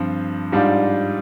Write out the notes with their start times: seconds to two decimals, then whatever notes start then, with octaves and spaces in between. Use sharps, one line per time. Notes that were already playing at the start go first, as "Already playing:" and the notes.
Already playing: G2 F3 C4
0.52 G#2 G3 D4 F4